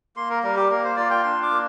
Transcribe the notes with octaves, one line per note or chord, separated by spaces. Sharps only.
A#3 C6
A#4
G3 A#4
G4
A#3 A#4
C5
F4 D5
G5
D4 C6
D6
A#3